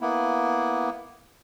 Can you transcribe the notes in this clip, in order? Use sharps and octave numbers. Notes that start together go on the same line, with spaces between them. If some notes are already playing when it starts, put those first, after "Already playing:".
A#3 B3 E4